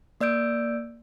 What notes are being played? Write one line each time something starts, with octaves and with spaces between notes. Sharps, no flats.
A#3 D5 E6 G6 D7